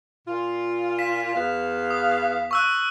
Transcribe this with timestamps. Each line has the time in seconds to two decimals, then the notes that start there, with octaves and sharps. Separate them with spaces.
0.27 A#2 F4
0.98 B6 E7
1.35 E2 B3 F5
1.91 D#6
2.51 C#6 E6 F#6